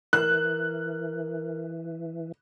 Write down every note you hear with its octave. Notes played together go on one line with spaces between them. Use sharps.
E3 A#4 F#6